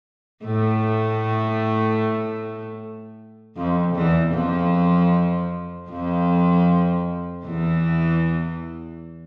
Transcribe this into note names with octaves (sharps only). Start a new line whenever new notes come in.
A2 A3
F2 F3
E2 E3
F2 F3
F2 F3
E2 E3